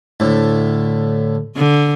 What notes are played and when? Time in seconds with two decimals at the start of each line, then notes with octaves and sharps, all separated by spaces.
0.20 D2 A2
1.57 D3